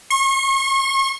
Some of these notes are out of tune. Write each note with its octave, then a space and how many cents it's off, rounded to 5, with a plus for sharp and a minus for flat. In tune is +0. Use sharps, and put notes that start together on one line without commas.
C#6 -40